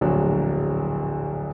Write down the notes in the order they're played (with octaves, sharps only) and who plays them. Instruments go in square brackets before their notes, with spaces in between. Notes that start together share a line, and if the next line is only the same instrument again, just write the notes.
[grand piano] D1 A#1 F#3